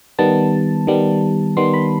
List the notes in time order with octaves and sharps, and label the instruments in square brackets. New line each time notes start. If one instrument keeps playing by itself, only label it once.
[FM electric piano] D#3 G3 B3 A5
D#3 G3 B3
D#3 G3 B3 C6
B5